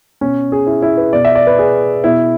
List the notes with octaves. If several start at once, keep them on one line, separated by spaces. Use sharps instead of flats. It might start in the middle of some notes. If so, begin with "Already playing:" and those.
B2 C#4
G#4
E4
E4
B4
B2 D5
E5
D5
B4
G#4
B2 E4